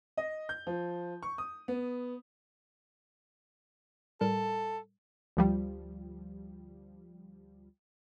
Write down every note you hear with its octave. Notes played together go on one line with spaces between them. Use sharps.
D#5
G6
F3
C#6
D#6
B3
A2 G3 A4 A#4
D2 F3 G3